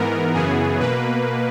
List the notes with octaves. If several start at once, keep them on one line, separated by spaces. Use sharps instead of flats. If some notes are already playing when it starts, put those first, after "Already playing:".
Already playing: G#2 E3 B3 A#4
F#2 C#3 E3 B3 G#4
B2 A#3 B4